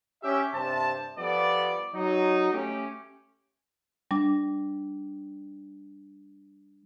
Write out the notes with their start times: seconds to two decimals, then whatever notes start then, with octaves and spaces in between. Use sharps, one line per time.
0.22 C#4 G4 E5
0.53 G2 C3 C5 A5
1.17 F3 G3 B3 A4 D5
1.93 F#3 D#4
2.51 A3 C#4 G4
4.11 G3 D4